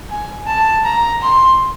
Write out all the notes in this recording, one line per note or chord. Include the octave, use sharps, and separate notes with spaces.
G#5
A5
A#5
C6